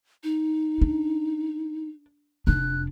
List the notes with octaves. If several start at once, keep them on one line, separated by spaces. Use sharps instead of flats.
D#4
D4
F1 D4 F#6